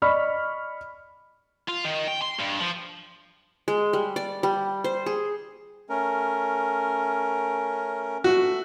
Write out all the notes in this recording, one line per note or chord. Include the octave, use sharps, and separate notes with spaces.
D5 D#5 B5 C#6 F6 B6
F4
D#3
G5
C6
G2
F3
G#3
G3
D5
G3
C5
G#4
A3 C#4 A#4
A3 F#4 E5